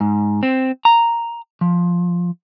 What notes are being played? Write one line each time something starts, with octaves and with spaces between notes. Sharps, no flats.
G#2
C4
A#5
F3